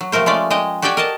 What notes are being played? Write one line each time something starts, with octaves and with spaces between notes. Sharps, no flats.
F#3
C3 F3 A3 A#4 C5
G#3 A3 C#4 F4 D5
G#3 D#5 G5
F#4 G4 A4 D5 G5 G#5
A#4 D#5 A5